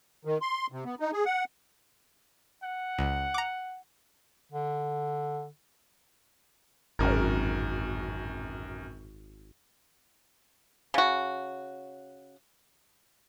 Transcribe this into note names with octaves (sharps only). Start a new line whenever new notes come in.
D#3
C6
C3
B3
D#4
G#4
F#5
F#5
C#2
A#5 D6
D3
D1 G#1 F#2 A#4
C#3 F#4